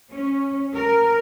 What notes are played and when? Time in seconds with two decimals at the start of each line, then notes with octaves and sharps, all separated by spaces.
0.12 C#4
0.75 A#4